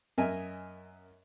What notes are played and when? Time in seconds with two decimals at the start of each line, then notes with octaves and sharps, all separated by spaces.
0.18 F#2 A#4 D#5 E5 G#5